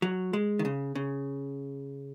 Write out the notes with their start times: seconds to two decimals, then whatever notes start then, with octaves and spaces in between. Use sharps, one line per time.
0.02 F#3
0.33 G#3
0.59 D#3
0.65 C#3
0.95 C#3